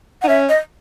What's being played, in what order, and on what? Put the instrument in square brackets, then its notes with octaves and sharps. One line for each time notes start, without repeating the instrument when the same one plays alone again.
[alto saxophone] D#4 [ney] F#5
[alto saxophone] C#4 [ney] E5
[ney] D#5